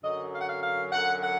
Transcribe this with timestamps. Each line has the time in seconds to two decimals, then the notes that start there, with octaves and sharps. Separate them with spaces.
0.03 F#2 D3 F#3 D#5
0.34 F5
0.41 F#5
0.49 F5
0.63 F5
0.92 F#2 D3 F#3 F#5
1.22 F#5